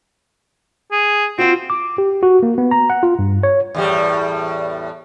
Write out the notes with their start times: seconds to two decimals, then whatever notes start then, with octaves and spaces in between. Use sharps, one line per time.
0.92 G#4
1.38 C4 F4 F#4
1.70 D6
1.98 G4
2.23 F#4
2.43 A#3
2.58 B3
2.71 A#5
2.90 F#5
3.03 F4
3.19 G2
3.43 C#5
3.75 E2 A2 G3